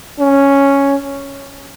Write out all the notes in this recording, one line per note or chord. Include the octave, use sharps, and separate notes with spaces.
C#4